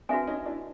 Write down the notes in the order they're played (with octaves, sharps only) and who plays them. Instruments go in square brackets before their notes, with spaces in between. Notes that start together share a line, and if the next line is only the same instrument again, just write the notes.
[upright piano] C4 D4 [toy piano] F#4 B4 E5 G#5
[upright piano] C#4 D#4
D4 E4